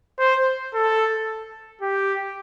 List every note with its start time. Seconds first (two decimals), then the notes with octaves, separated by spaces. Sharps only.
0.19 C5
0.74 A4
1.81 G4